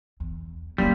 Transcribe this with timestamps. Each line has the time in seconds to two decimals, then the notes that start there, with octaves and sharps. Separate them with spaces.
0.20 E2
0.78 E1 C#2 F#3 G3 A#3 C#4